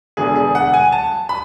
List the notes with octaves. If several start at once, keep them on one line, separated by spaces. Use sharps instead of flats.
E1 E2 D3 G#4
G#4
F#5
G#5
A5
B5